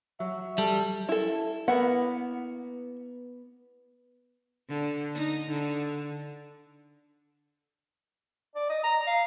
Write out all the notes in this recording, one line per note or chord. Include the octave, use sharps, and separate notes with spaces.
F#3 E5
G3 A4
E4 A4
A#3 B3 E4 F#5
D3
D#4
D3
D5
D#5
A#5
F5